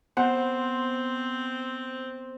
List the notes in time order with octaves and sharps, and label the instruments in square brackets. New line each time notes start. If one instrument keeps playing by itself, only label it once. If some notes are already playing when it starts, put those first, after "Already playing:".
[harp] B3 [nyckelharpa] C4 [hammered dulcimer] C5 [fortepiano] F#5